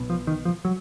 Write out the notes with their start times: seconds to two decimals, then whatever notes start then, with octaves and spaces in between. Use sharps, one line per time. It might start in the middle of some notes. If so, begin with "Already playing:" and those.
Already playing: B1 B2
0.10 F3
0.27 D#3
0.45 F3
0.65 F#3